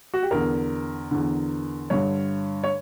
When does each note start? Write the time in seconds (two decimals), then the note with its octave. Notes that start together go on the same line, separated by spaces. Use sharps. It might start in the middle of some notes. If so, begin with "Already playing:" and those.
0.14 F#4
0.22 G4
0.31 E2 D3 A#4
1.11 E2 D3
1.90 G2 D3 C#5
2.64 C#5